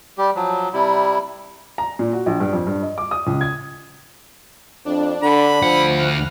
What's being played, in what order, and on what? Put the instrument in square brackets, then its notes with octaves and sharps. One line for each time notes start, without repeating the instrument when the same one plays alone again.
[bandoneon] G3 G4
F3 F#3
C3 G3 E4
[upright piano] A#5
A#2
F#4
A#1
G2
F2
G2
D#5
D6
D#6
C#2
G#6
[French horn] F2 [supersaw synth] D4
[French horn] D3 [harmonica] B5
[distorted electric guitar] D2 F#5 [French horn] F3
[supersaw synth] F6 F#6